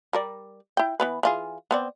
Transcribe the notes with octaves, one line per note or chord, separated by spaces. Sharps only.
G3 A#4 D5
E4 G5
E3 B3 B4
E3 F4 G#4
B3 C4 D5